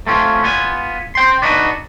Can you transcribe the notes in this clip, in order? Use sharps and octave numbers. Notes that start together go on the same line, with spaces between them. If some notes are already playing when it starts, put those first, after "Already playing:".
A3 C4 C#4 F4
B3 F4 G#5
C5 G5 C6
D4 D#4 F#4 B4 D5